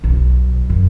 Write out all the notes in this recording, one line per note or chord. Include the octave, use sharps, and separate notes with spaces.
B1
F#2